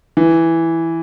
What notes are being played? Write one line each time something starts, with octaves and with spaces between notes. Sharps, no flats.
E3